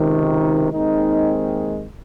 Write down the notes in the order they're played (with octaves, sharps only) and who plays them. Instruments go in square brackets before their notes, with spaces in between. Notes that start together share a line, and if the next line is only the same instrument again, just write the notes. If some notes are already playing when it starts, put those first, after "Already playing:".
Already playing: [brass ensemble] C#2 C3 D#3
D#4
D#2 D#3 G#3 C4 D#4